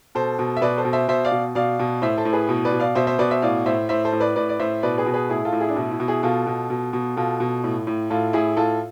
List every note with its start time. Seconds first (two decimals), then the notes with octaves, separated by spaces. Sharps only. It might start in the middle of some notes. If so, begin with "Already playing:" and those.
0.15 B2 A4 C5
0.39 B2
0.57 E5
0.61 B2 B4 D5
0.77 A4 C5
0.85 B2
0.93 C5 E5
1.08 B2 C5 E5
1.25 D5 F5
1.31 B2
1.55 B2 D5 F5
1.79 B2
2.02 A2 C5 E5
2.18 A4 C5
2.25 A2
2.33 G#4 B4
2.49 B2
2.65 B4 D5
2.72 B2
2.80 D5 F5
2.95 B2 C5 E5
3.07 C5 E5
3.19 B2 B4 D5
3.31 C5 E5
3.42 A2 D5 F5
3.66 A2 C5 E5
3.89 A2 C5 E5
4.05 A4 C5
4.12 A2
4.20 B4 D5
4.36 A2 B4 D5
4.49 D5
4.60 A2 C5 E5
4.83 B2 B4 D5
4.98 G#4 B4
5.06 B2
5.14 G#4 B4
5.29 A2 E4 G#4
5.45 F4 A4
5.53 A2
5.61 E4 G#4
5.69 D4
5.76 B2 E4
5.91 E4
6.00 B2
6.08 E4 G#4
6.23 B2 F4 A4
6.47 B2
6.70 B2
6.93 B2
7.16 B2 F4 A4
7.40 B2
7.64 A2
7.87 A2
8.10 A2 F4 A4
8.33 A2 E4 G#4
8.57 A2 F4 A4